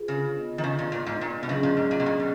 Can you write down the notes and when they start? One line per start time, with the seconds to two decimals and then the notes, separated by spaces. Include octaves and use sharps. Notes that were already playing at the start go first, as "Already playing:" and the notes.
Already playing: F4 G#4 B4
0.08 C#3
0.36 B3 F4 B4 D#5
0.58 D#3
0.64 C#3
0.79 A#2
0.92 A#2
1.06 G#2
1.21 A#2
1.43 B2
1.49 C#3 F#3 C#4 G#4 D#5
1.63 A#2
1.77 G#2
1.91 A#2
2.00 B2
2.06 A#2
2.19 B2